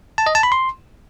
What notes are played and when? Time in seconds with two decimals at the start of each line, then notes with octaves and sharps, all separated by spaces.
0.18 A5
0.26 D#5
0.35 A5
0.43 B5
0.52 C6